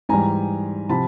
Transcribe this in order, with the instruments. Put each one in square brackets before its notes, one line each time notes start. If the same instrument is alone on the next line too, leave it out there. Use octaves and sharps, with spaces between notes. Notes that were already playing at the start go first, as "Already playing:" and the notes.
[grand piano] G#2 E3 G3 G#5 A#5
C3 F3 A5 B5